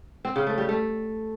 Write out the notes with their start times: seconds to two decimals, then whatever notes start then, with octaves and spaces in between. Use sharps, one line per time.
0.25 C4
0.36 C#3
0.47 A3
0.58 G3
0.69 A3